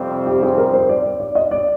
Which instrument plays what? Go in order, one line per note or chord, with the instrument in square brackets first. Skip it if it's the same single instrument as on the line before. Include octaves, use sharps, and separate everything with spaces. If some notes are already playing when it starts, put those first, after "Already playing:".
Already playing: [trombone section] F2 C3 G3 C4
[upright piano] G4
G#4
A#4
C5
D5
D5
D5
D#5
D5